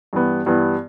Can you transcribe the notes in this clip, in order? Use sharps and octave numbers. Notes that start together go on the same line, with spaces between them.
G2 E3 B3
G2 E3 B3